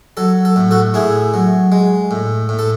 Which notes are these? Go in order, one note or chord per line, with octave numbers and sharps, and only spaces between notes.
F#3 A4
A4
A2
F#4 A4
A2 E4 G#4
F#3
G#3
A2
A2
A4